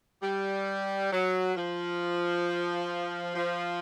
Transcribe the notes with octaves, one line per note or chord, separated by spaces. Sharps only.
G3
F#3
F3
F3